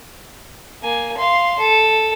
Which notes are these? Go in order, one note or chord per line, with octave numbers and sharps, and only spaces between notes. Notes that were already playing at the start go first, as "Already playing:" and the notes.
A#3 G#5
F5 C6
A4